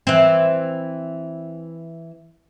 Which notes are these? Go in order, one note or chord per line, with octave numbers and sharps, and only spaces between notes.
E3 C4